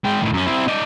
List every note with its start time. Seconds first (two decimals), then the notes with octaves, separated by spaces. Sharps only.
0.05 G#3 G5
0.21 A2 D#3
0.33 F#2 C#4
0.46 C4 E4
0.68 D#4 D5